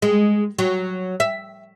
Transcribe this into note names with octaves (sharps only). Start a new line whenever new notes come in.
G#3
F#3
E5